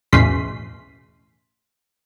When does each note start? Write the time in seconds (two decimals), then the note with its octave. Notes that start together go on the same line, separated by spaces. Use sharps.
0.12 B1 E2 A2 C#3 C6 B6